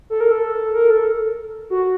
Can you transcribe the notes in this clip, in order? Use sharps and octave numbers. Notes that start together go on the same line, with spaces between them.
A4
A#4
A4
A#4
A4
F#4